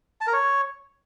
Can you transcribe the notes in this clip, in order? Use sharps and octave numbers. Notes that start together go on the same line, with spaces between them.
A5
A#4
C#5